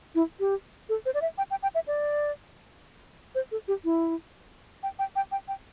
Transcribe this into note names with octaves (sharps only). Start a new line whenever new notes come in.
E4
G4
A4
C5
D5
E5
G5
G5
G5
E5
D5
C5
A4
G4
E4
G5
G5
G5
G5
G5